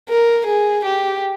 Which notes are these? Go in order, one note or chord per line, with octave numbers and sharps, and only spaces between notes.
A#4
G#4
G4